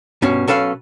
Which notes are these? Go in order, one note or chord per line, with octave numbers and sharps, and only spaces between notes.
G2 B2 C#4
B1 C#4 A4 B4 F5